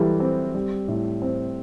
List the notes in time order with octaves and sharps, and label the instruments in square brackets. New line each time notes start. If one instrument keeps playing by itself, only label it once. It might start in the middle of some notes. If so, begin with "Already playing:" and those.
Already playing: [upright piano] E3 G3 [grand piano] F#3 A4
[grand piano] C4
G3
A2
C4